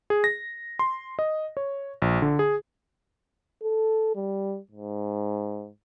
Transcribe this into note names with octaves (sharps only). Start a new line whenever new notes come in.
G#4
A#6
C6
D#5
C#5
A#1
D3
G#4
A4
G3
G#2